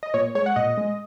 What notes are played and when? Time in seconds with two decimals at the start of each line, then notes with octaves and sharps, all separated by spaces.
0.03 D#5
0.14 A#2 C#5
0.35 G#3 C#5
0.46 F#5
0.56 A#2 D#5
0.78 G#3